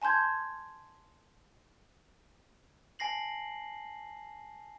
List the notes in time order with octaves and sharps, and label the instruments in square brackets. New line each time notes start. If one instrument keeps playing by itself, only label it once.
[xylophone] G#5 A5 C6 G6 G#6
[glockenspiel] G#5 A5 A#6 C7 F#7